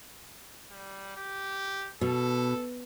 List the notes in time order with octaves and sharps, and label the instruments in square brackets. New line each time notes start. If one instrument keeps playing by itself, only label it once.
[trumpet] G3
G4
[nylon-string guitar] B2 [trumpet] A4